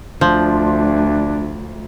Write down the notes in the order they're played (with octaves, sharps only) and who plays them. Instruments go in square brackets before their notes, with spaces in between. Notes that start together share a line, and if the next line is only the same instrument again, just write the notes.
[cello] D2 [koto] F3 [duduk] D4